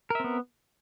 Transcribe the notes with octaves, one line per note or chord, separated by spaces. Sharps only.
B3 C4 A#4 E5